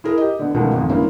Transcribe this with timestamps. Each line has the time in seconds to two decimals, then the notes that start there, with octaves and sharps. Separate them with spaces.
0.04 E4 G#4 A#4
0.17 G4 D#5
0.39 D3 B3
0.54 C#2 B2 D#3 F3 A3 B3
0.73 G#1 F2
0.89 G1 C#3 A#3 E4